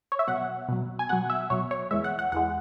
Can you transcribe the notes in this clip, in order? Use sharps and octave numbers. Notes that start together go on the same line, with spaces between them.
C#5
E5
B2 F#3 F#5
B2 F#3
G#5
B2 F#3 F#5
E5
B2 F#3 C#5
C#5
E2 E3 G#3 E5
F#5
F#5
E2 E3 G#3 F#5